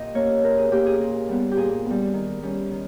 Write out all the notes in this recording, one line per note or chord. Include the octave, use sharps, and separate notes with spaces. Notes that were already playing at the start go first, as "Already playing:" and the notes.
Already playing: A#2 G4 D#5
A#3 C#4 C#5
A#2 A#4
G#4
A#3 C#4 G4
G#4
A#2
G3 B3
G4
A#2 G#4
G3 B3
D#3
G3 C#4
D#3